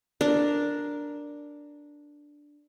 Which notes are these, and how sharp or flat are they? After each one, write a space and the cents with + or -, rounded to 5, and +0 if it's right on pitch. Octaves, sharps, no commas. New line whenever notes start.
D4 +0 A#4 +0